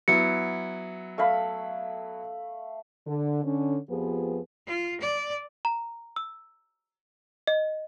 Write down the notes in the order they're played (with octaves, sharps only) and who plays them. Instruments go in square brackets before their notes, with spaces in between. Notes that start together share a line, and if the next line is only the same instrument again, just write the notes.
[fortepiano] F#3 B3 E4 [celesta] C#7
[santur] A3 F5 B5
[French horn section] D3
D3 C#4
F2 F3 B3 G4 G#4 B4
[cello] F4
D5
[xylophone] A#5
E6
D#5